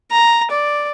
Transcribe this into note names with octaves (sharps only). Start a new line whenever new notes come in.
A#5
D5